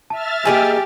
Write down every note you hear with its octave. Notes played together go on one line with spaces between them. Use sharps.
E5 A5 F6 A6
A#3 D#4 G4 G#4 G#5